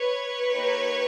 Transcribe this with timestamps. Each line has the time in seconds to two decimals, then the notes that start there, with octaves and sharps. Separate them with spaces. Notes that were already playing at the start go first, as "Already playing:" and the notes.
Already playing: B4 C#5
0.52 A#3 D#4 G4